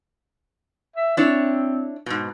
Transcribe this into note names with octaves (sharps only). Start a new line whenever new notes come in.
E5
C4 D4 E4 C#5
G#2 B2